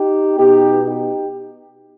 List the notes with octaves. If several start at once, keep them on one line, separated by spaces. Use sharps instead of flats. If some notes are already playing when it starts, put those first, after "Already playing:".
Already playing: D#4 G4
B2 B3 D#4 G4
D#4 G4